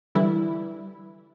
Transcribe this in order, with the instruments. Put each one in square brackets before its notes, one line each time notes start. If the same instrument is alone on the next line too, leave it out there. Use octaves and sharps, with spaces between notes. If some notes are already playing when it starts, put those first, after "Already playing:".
[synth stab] D3 E3 G3 E4